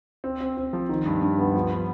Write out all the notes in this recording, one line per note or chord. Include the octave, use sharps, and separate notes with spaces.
C4
C4
C4
F3
D#3
G2
G2
B3
F3
B3